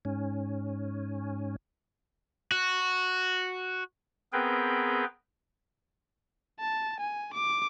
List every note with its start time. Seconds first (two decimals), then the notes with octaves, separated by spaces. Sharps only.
0.05 G#2 C#4
2.52 F#4
4.33 B3 C4 G#4 A#4 B4 G5
6.60 A5
7.00 G#5
7.34 D6